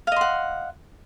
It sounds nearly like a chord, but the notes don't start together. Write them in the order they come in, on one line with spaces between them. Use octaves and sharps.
F5 D#5 C6 F#5